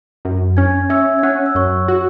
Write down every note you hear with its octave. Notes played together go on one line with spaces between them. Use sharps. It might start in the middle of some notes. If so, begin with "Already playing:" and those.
F#2
C#4 G#5 G#6
C#4 E5 E6
G#6
C#4 F#5 F#6
E6
F#2 C#5 C#6
F#4